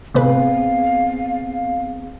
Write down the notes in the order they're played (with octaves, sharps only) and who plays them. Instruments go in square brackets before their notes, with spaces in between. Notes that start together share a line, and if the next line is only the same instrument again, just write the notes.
[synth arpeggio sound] A2 C3 B4 [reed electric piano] B3 C4 G#4 [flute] F5